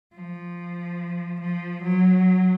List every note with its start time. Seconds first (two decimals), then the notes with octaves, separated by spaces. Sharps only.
0.15 F3
1.40 F3
1.83 F#3